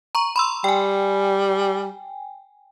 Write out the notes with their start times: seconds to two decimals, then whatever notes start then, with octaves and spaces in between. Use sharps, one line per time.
0.15 A#5 C#6
0.36 B5 C6 E6
0.64 G3 G5 G#5